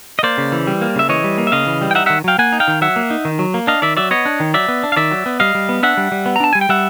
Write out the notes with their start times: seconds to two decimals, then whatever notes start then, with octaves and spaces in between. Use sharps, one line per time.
0.19 D#5
0.23 A#3 C5 D5
0.38 C#3
0.52 E3
0.67 G3
0.81 A#3
0.96 C#3 E5
1.09 E3 C#5 D#5
1.24 G3
1.38 A#3
1.47 E5
1.52 C#3 D#5 F5
1.67 E3
1.81 G3
1.91 G5
1.95 D#4 E5 F#5
2.06 D#3 E5 F#5
2.24 F#3 F5 G5
2.38 A#3 F#5 G#5
2.53 D#4
2.60 F5 G5
2.68 D#3
2.81 F#3 E5 F#5
2.96 A#3
3.11 D#4
3.25 D#3
3.39 F#3
3.54 A#3
3.67 D4 D#5 F5
3.82 D#3 D5 E5
3.97 F#3 D5 E5
4.11 B3 C#5 D#5
4.26 D4
4.40 D#3
4.54 F#3 D5 E5
4.68 B3
4.83 D4
4.92 F5
4.96 D#3 D5 E5
5.11 F#3
5.26 B3
5.40 G3 D#5 F5
5.55 G3
5.69 B3
5.83 D4 E5 F#5
5.97 G3
6.12 G3
6.26 B3
6.36 A#5
6.40 D4 A5
6.53 G3 G#5
6.61 G5
6.69 G3 E5 F#5